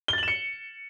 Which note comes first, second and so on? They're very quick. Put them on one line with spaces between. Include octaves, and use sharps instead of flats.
G7 A6 F#7 E7 C#7